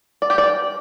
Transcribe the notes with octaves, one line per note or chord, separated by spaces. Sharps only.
D5
G4
D5